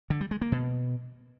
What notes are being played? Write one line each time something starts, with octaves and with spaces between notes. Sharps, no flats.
D3
G3
G#3
A#3
B2